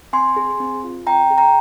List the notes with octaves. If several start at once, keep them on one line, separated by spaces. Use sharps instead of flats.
C4 G#5 C6
G#4
C4
F4
C4 G5 A#5
G#4
G5 A#5